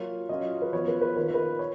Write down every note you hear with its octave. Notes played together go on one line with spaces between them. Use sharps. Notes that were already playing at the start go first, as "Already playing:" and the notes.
Already playing: F#3 A#3 F4 C#5
F#3 C#4 F4 D#5
B4
F3 B3 F4 C#5
B4
B4
D#3 A#3 F4 B4
A#4
B4
C#5